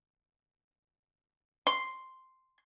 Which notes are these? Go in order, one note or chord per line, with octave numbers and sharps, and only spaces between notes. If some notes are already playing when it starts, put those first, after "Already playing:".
C6